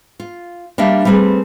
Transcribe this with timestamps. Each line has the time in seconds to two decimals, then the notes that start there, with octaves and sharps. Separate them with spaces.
0.20 F4
0.78 G3 A#3 D4 E5 F5
1.05 G3 A3 C4 G#4 B4